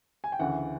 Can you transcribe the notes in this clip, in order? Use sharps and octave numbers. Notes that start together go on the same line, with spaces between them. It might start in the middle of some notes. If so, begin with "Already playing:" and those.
G#5
G5
D2 C#3 E3 F#5